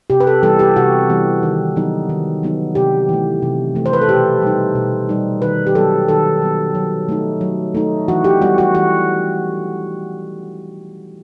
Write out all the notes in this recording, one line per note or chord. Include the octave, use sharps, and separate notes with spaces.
C3 G4
B4
A4
E3 G3 B3 A4
G4
C3 F#4
E3 G3 B3
D#3
F#3 B3 D#4
D#3
F#3 B3 D#4
C3 G4
E3 A3
C3
E3 A3
C5
B4
A4
B2 G4
G3 D#4
B2
G3 D#4
D#3 B4
G4
F#3 B3 A4
D#3 A4
F#3 B3
F#3
A3 D#4
F#3
A3 D#4
E3 F#4
G4
G3 B3 F#4
F#4
E3 F#4